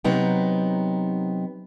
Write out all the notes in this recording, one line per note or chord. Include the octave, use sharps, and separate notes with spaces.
C3 F#3 B3 D#4 G5